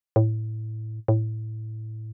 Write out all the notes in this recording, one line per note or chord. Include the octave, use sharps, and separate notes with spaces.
A2
A2